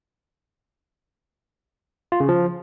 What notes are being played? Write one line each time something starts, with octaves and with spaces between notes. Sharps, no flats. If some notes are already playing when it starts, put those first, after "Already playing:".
F4
C#3
F3